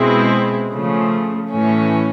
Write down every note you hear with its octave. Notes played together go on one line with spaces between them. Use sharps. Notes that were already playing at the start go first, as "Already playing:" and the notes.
Already playing: B2 G#3 C4 E4
C#3 F3 A3
A2 E3 A3 C#4